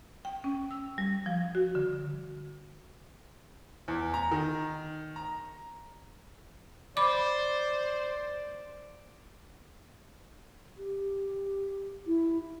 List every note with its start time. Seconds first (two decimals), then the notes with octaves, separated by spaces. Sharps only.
0.25 G5
0.44 C#4
0.71 E6
0.98 G3
1.26 F3
1.55 F#4
1.75 D3
3.88 E2
4.14 A#5
4.31 D#3
5.16 A#5
6.97 C5 D5 B5 D6
10.78 G4
12.07 E4